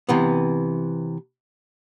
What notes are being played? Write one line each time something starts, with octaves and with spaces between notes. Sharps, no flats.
C3 E3 B3